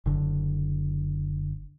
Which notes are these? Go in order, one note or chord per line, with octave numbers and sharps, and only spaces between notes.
F#1 D3